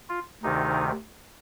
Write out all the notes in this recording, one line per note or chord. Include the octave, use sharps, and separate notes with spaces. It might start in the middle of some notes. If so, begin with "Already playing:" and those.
F4
D2 C3 D#3 D#4